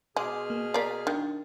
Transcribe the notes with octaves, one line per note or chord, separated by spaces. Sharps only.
B2 G#3 G#4 C6 D6 F6
A#3
A#4 D5 B6 C7
D#3 D4